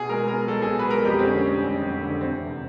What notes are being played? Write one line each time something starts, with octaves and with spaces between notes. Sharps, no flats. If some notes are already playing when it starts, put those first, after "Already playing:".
Already playing: B2 G#4
G#3 A#4
B3 A#4
B1 A4
B2 G#4
B4
G#3 A#4
F2 G4
C4
D3 C#4
G3
F#1
F2
D3
E2 C4
C3